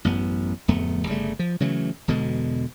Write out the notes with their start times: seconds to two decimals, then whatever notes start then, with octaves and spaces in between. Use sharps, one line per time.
0.05 A1 F#2 B3
0.68 D1 F2 A3 B3
1.07 G1 C#3 G3 A3
1.39 F3
1.60 C#3 E3 F#3 A3
2.08 E1 B2 D3 G#3